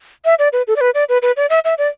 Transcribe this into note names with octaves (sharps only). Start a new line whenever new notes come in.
E5
D5
B4
A4
D5
B4
D5
B4
B4
D5
E5
E5
D5